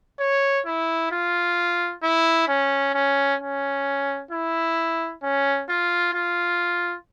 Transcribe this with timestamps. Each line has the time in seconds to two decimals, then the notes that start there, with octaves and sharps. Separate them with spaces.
0.19 C#5
0.66 E4
1.12 F4
2.03 E4
2.48 C#4
2.94 C#4
3.40 C#4
4.31 E4
5.23 C#4
5.69 F4
6.14 F4